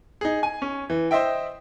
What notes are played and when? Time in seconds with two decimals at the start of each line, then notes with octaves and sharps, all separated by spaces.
0.21 D#4 G#4
0.43 G#5
0.62 C#4
0.90 E3
1.11 C5 D#5 E5 G5